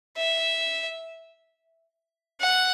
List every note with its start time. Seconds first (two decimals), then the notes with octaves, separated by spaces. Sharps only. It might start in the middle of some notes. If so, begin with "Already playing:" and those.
0.18 E5
2.41 F#5